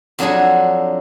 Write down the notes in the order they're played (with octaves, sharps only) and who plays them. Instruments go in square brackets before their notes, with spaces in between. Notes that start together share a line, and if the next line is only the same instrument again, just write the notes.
[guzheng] F2 F#3 D4 G#4 A4 G#5